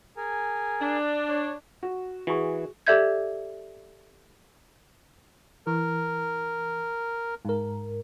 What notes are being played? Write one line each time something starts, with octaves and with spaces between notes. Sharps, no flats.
G#4 A#4 G#5
D4
C#5
F#4
E3 F#4 G#4 C#6
G4 A4 D5 E5 G6 G#6
E3 A#4
G#2 A#4